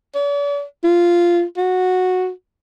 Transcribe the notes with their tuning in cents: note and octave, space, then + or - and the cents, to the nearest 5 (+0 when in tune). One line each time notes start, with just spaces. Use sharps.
D5 -45
F4 -10
F#4 -10